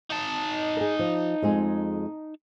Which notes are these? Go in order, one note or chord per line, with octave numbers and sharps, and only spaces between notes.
D#4 A5
G#4 A#4
F3
F2 G#3 G#4